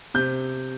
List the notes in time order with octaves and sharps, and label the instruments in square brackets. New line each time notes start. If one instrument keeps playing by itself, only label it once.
[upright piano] C3 G6